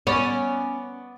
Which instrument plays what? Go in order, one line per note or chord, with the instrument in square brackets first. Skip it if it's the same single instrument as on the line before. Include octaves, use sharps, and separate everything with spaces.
[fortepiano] B3 D5 [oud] C#4